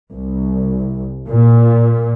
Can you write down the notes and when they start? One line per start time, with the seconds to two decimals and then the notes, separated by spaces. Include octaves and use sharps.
0.13 C2
1.28 A#2